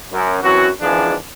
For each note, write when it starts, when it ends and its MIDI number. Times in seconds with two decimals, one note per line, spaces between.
0.12 0.39 42
0.43 0.68 42
0.43 0.68 52
0.43 0.68 54
0.43 0.68 60
0.43 0.68 66
0.80 1.15 32
0.80 1.15 37
0.80 1.15 52
0.80 1.15 53
0.80 1.15 62
0.80 1.15 68